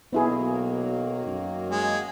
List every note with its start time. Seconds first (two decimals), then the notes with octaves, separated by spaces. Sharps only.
0.13 B1 D#3 F#3 A#3 B3 E4 G#4
1.26 F#2
1.70 G#3